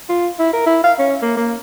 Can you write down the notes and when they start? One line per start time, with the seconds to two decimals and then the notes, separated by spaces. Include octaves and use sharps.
0.09 F4
0.39 E4
0.53 A#4
0.66 E4
0.84 F5
0.99 C#4
1.22 A#3
1.37 A#3